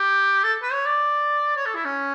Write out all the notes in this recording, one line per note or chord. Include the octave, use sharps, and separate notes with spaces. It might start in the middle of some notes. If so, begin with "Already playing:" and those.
Already playing: G4
A4
B4
C#5
D5
C#5
A4
E4
C#4